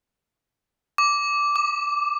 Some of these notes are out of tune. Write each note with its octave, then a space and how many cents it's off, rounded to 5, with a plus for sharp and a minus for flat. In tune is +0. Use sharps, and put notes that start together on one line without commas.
D6 -10
D6 +20